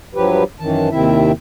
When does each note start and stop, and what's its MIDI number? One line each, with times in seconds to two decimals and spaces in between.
0.15 0.44 43
0.15 0.44 53
0.15 0.44 54
0.15 0.44 67
0.15 0.44 71
0.60 0.89 42
0.60 0.89 51
0.60 0.89 52
0.60 0.89 81
0.91 1.32 39
0.91 1.32 48
0.91 1.32 51
0.91 1.32 60
0.91 1.32 64
0.91 1.32 76